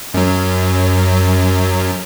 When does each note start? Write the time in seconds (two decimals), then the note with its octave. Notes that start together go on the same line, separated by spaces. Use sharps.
0.14 F#2 F#3